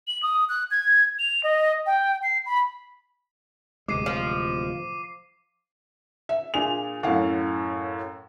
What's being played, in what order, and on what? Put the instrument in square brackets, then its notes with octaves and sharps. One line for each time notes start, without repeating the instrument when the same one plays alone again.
[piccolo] F#7
D#6
F#6
G#6
F7
D#5
G5
C7
B5
[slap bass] D1 C3 G#3 [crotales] D6 C7 D#7
[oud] F3
[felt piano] E5
[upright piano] A#2 G#4 F7 [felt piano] D4 F4
[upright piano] F#2 A2 [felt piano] F5 F#5